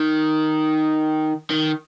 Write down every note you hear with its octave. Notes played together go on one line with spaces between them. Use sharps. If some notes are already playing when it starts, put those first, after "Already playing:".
Already playing: D#3
D#3